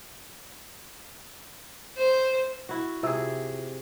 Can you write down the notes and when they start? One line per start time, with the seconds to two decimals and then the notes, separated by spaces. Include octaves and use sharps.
1.97 C5
2.69 E4 F#4
3.03 C3 F4 G#4 E5 E6